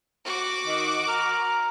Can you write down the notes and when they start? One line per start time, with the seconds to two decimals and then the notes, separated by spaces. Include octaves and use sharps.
0.25 F#4 D6
0.66 D#3
1.08 A#4